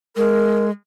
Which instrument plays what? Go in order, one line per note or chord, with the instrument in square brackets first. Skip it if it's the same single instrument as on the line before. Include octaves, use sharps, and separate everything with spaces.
[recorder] G#3 [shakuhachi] A#4